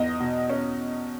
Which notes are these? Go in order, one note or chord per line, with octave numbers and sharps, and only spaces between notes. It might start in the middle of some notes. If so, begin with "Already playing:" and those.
Already playing: E2 D#5
B2
C#4